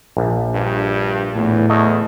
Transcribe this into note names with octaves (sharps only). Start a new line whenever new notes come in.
A#1
G2
E2 A2
E2 A3 D#5